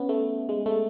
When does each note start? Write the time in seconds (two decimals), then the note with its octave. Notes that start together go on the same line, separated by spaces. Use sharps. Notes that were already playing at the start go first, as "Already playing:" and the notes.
Already playing: B3 C#4
0.09 A3
0.49 G#3
0.66 A3